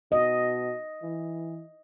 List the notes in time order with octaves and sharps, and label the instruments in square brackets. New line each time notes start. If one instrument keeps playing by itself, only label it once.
[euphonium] B2 [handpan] D#5
[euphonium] E3